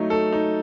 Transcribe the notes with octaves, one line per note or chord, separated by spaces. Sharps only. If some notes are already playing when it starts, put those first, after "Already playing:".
Already playing: F#3 A3 D#4
A4
D#4